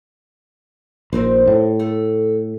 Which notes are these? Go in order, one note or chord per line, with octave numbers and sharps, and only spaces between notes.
A#1 C4 D#4 C5
A2
A3